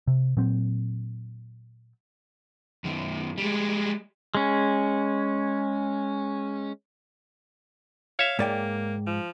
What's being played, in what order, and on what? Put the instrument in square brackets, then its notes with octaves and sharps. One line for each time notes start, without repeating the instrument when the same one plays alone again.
[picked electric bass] C3
A#2 F#3 C4
[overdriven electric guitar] F#2 D#3
G3 G#3
[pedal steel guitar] G#3 C#4
[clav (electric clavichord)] C#5 E5 [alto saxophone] F5
[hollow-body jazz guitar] G#2 D5 G5 [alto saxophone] A#3
[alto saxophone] F3